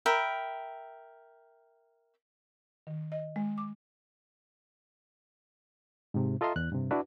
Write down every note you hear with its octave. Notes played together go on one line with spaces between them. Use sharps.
A#4 E5 G5 B5
D#3
D#5
G#3
D6
G#2 C3
F4 A4 D#5 E5 A#5 C6
E2 F#6
G2 C3
D4 E4 F#4 B4